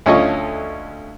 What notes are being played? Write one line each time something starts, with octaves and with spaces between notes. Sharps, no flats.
D2 C#4 F4 A4 D#5 C#6